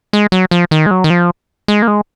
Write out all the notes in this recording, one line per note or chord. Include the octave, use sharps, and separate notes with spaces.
G#3
F#3
F3
D#3
G#3
F#3
D#3
F3
G#3
A#3
G#3